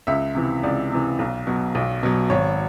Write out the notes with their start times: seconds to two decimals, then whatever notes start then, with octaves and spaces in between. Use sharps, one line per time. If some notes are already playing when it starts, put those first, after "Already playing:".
0.07 C#2 E5
0.35 C3 E3
0.63 C#2 D5
0.92 C3 E3
1.19 B1
1.47 B2 F#3
1.75 B1
2.03 B2 F#3
2.30 G#1 C#5